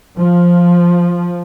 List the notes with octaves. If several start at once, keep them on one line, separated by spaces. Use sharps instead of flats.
F3